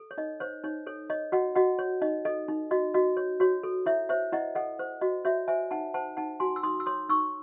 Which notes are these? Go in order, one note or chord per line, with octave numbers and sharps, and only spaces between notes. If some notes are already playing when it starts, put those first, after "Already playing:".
Already playing: A4
C#5
D#4 D#5
C5 C#5
D#4 C#5
A4 C#5
C#5 D#5
F#4 D#5 F#5
F#4 D#5 F#5
C#5
D#4 D#5
A4 D#5
D#4
F#4 D#5
F#4 D#5
C#5
F#4 C#5
A4
E4 C#5 E5
C5 C#5 E5
E4 D#5 F#5
A4 D#5 F#5
C5
F#4 D#5
F#4 C#5 E5
C5 E5 G#5
D#4 F#5 A5
C5 F#5 A5
D#4 F#5 A5
F#4 G#5 C6
E6
D#4 C6 D#6
E6
C#5 C6 D#6
D#4 C#6 E6